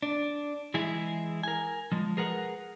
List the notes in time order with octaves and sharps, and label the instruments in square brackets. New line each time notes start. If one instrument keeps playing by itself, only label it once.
[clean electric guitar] D4
E3 G#3 E4 G#4
A#4 G#5
F3 G#3
G#4 A#4 B4 F#5